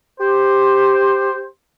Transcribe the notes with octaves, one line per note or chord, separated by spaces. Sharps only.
G4 C5